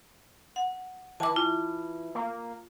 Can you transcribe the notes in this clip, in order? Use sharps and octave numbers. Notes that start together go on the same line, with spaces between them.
F#5
E3 A5 D6
F4
A#3